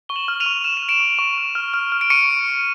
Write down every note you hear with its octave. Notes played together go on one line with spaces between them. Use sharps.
C#6 G7
E7 F#7
F6
D#7 F7
C#6
F6 E7
D#7
F6
D7 E7
C#6
C#6
F6
F6
F6
F6
D7
C#6 C#7 D#7